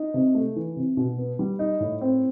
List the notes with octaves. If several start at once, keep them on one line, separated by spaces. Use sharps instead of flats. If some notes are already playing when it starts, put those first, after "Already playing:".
Already playing: D#4
C3
A3
E3
C3
B2
B3
G3
D#4
A2
C4